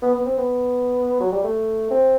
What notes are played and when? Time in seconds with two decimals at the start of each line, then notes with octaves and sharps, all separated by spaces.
0.02 B3
0.15 B3
0.26 C4
0.38 B3
1.20 F#3
1.32 G3
1.44 A3
1.91 C4